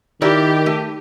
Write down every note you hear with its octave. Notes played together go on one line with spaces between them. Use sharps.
D#3 E4 G4 A#4 D5
A3